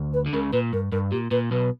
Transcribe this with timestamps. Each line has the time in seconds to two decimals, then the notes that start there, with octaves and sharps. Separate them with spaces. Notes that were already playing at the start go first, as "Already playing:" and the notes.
Already playing: D2
0.14 B4
0.26 D3
0.33 C#2 C#3 A#4
0.52 A#2 B4
0.72 G2 A#4
0.92 G2 A#4
1.11 A#2 G4
1.31 A#2 B4
1.51 B1 B2 B4